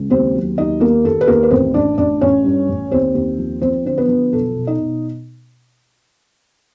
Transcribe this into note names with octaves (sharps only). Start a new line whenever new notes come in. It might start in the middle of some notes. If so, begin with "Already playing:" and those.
Already playing: C#2
D#2 C4 C5
F#3
D#2 D#4 D#5
D#2 A#3 A#4
D#2 A4
B4
D#2 A#3 A#4
B4
A1 C4 C5
A1 D4 D5
A1 D4 D5
A1 C#4 C#5
G2
A1
D#2 C4 C5
D#2
F3
F3 C4 C5
D3 C5
B3 B4
F3
B1 A4
B2
D#4 D#5
B2